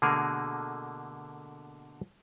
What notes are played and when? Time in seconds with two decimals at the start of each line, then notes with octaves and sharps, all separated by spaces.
0.02 B2 D3 A3 A#3 G#4 A#4